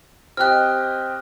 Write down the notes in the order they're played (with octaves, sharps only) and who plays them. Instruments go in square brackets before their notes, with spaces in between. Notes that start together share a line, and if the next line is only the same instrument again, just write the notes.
[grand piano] C4 G4 D#5 [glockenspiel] F6 F#6